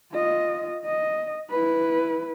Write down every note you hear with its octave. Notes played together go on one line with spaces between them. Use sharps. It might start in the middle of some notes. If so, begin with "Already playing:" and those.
F4 D#5
D#5
E4 B4